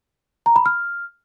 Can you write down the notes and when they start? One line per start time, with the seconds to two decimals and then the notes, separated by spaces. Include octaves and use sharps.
0.46 A#5
0.56 B5
0.66 F6